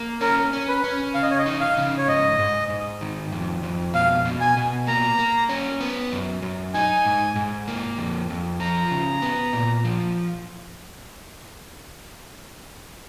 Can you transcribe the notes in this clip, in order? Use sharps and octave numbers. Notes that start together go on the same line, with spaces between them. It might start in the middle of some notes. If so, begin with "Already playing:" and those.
Already playing: A#3
C#4 A#4
C#4
B4
C#4
C#3 F5
D#5
C#5
D#5
D#4
F5
C#3
C#5
G#2 D#5
G#2
G#2
D#3
F2
F2
B2 F5
B2
G#5
B2
A#3 A#5
A#3
C#4
B3
F#2
F#2
D#4 G#5
G#2
G#2
A#3
F2
F2
F3 A#5
C#3
B3
A#2
F3